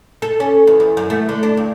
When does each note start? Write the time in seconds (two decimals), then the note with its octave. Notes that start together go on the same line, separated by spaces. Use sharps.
0.22 A4
0.40 C#4
0.67 E2
0.80 E2
0.97 F#2
1.10 A3
1.29 D3
1.43 D4
1.57 G2